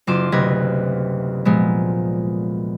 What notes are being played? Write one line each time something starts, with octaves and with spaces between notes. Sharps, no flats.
F#1 F4 C6 D6 E7
F#1 D2 C3 B4 D#5 G#6
A#2 F3 G#3 B3